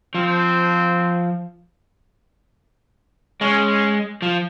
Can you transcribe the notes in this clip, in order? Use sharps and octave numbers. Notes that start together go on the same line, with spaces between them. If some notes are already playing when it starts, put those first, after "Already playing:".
F3 C4
G#3 C#4
F3